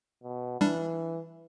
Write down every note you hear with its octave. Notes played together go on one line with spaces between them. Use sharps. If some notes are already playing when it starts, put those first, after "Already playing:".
B2
E3 G3 D4